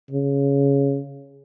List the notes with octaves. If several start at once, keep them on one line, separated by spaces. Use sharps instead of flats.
C#3